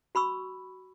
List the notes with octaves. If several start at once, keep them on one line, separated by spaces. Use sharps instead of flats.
F#4 B5 C#6 E6